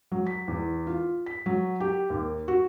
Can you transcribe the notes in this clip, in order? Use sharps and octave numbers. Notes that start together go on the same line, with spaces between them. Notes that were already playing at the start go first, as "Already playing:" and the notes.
F#3
B6
E2
F4
B6
F#3
G4
D#2
F#4